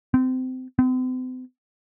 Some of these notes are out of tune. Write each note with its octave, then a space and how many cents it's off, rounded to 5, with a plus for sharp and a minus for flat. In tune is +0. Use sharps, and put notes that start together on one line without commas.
C4 -25
C4 -45